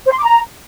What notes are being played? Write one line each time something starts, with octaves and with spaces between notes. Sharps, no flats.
C5
C6
D6
A#5